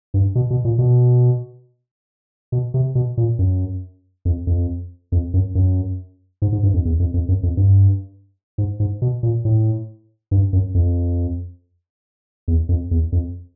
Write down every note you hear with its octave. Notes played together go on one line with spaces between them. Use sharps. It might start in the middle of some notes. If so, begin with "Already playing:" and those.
G2
B2
B2
A#2
B2
B2
C3
B2
A#2
F#2
F2
F2
F2
F#2
F#2
G#2
G#2
G2
F2
E2
F2
F2
F#2
F2
G2
G#2
G#2
B2
A#2
A2
G2
F#2
F2
E2
F2
E2
F2